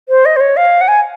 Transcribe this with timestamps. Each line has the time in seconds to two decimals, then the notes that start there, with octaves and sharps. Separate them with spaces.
0.09 C5
0.25 D#5
0.36 C5
0.40 C#5
0.57 F5
0.81 F#5
0.88 G#5